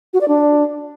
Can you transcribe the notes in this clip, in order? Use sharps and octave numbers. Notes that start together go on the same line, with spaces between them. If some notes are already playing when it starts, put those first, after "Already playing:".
F#4
D5
D4